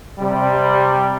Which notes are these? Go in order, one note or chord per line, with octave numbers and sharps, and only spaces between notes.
C3 G3